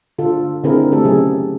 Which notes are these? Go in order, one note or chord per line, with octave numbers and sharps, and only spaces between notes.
D3 F4 A4
D3 C4 E4 G#4 A#4
A3 C4 G4 A4
C#3 F#3 G#4